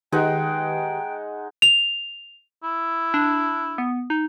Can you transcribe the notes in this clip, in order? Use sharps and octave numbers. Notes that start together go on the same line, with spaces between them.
D#3 G#3 D#4 G4 B4 F#5 G5
F7
E4
D4
B3
D#4